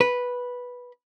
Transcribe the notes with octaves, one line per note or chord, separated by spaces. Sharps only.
B4